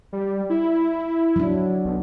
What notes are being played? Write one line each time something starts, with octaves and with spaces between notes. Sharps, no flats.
G3
E4
F#3 D4
B1